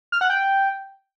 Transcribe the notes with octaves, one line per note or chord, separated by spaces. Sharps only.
F6
F#5
G5